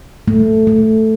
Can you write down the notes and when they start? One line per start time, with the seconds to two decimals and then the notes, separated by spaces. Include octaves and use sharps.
0.28 A3
0.67 A3